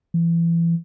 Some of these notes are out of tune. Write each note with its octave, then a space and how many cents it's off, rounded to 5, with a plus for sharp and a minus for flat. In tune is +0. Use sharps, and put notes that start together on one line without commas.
E3 +30